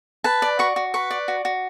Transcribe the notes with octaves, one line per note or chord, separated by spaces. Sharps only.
B4 A5
D5
F#4 C#6
F#4
B4 C#6
D5
F#4
F#4